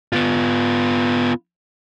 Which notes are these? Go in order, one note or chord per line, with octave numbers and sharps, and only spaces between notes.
B3 F4